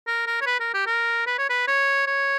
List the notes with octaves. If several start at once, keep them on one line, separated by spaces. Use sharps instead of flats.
A#4
A#4
C#5
B4
A#4
G4
A#4
B4
C#5
B4
C#5
C#5